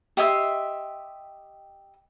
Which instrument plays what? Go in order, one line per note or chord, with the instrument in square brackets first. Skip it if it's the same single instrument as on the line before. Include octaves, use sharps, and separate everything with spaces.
[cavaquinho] G4 D#5 E5 C6